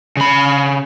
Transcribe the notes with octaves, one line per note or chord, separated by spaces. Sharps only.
C#3 B5